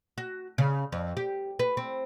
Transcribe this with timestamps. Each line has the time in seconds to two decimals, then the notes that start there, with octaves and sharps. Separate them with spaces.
0.18 F#4
0.58 C#3
0.92 F2
1.17 G4
1.59 B4
1.77 C4